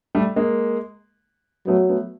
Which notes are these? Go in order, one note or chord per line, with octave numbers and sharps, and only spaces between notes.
G3 A3
G#3 A#3
F#3 A3 B3
A3 B3